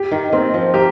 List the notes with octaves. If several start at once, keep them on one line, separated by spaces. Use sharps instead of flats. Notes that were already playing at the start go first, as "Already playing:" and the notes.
Already playing: G4
D#3
D#3 C4
F3
A#3 G4